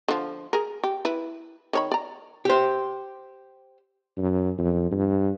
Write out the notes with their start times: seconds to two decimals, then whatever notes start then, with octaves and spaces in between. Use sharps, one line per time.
0.08 D3 F3
0.53 G#4 A#4
0.83 G4
1.05 E4 B4
1.73 D#3 C#5 B5
1.92 D5 A#5
2.45 G4 C5
4.18 F#2
4.58 F2
4.92 G2